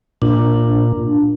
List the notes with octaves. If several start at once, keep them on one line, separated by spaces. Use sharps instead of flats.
A#2 D4